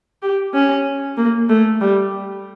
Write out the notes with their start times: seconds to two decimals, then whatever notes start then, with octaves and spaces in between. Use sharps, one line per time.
0.22 G4
0.54 C#4
1.17 A#3
1.49 A3
1.81 G3